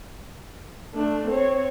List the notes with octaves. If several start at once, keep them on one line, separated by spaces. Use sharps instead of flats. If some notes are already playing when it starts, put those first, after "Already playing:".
A3 D4
C4 C#5